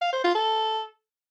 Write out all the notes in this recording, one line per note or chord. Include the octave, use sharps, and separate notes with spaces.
F5
C5
F4
A4